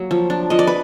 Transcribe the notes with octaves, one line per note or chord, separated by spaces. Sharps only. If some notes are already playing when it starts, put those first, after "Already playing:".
Already playing: F#3 A#3
F3
D4
F3 D#5
D5
B4